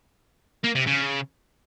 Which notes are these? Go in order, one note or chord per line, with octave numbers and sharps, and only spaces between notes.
A#3
C3
C#3